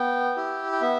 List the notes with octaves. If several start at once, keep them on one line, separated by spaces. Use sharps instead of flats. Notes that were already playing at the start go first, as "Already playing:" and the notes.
Already playing: B3 G5
E4 G4
G5
B3 E5